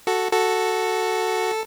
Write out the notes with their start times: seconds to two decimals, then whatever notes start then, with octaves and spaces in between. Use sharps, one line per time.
0.07 F#4 A4
0.32 F#4 A4